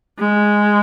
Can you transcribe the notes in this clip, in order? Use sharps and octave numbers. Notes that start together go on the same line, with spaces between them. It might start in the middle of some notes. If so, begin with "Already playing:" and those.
G#3